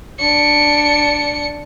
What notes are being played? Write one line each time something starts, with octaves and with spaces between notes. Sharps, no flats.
D4 C#7